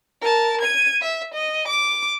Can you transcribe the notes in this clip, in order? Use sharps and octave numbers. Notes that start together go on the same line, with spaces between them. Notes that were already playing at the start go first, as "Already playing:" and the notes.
A#4 A5
G#6 D#7
E5
D#5
D6